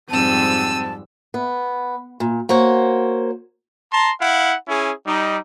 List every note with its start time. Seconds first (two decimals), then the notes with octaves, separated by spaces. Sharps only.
0.10 F2 G#2 G3 C4 A5 E6 D#7
1.34 B3
2.20 A#2
2.49 A#3 F#4 C5 C#5
3.91 A5 A#5 C6
4.20 E4 F5 F#5
4.68 C#4 E4 G#4
5.06 G3 D#4